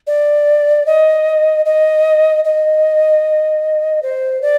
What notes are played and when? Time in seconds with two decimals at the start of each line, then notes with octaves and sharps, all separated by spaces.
0.07 D5
0.86 D#5
1.65 D#5
2.44 D#5
4.02 C5
4.41 D5